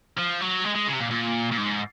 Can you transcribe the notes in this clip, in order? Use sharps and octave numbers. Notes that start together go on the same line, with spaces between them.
F3
F#3
G#3
G#3
C#3
C3
A#2
A#2
A#2
G#2